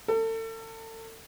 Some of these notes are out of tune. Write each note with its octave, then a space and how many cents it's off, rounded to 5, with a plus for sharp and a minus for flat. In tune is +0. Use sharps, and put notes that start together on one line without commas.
A4 +35